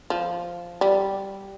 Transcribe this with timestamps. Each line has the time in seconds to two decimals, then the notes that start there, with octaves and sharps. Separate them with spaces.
0.10 F3
0.81 G3